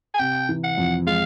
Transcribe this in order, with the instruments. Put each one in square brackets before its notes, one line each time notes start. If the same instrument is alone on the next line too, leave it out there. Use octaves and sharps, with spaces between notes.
[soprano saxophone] G#5
[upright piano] C3 [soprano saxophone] G5
[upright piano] E3
[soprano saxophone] F#5
[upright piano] F2
[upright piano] G#3 [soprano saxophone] F5